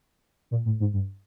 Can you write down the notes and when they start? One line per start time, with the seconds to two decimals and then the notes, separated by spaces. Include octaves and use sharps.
0.51 A#2
0.65 A2
0.80 G#2
0.93 G2